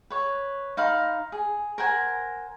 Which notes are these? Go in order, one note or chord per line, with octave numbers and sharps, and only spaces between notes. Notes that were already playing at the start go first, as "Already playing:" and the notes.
B4 C#5
D#4 F5 B5 C6
G#4
A#4 C5 F#5 G#5